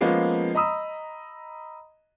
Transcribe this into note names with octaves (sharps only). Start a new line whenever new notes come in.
F3 G#3 A#3 B3 C#4
D#5 A#5 B5 D#6 E6